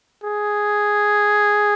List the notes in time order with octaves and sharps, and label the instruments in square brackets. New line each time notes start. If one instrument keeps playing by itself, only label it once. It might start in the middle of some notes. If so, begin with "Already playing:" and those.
[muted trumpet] G#4